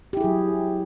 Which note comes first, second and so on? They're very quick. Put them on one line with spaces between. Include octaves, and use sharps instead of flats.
G4 E4 G#4 F#3